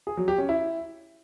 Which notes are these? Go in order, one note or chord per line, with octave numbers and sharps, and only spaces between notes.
G#4
F#3
G4
C#4
E4